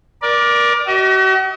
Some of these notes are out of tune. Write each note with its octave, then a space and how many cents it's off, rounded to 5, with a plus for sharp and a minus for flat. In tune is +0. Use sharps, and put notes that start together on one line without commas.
A#4 +30 D5 +0
F#4 +45 D#5 +40